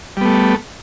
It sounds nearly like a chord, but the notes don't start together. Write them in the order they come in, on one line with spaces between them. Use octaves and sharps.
G3 B3 A3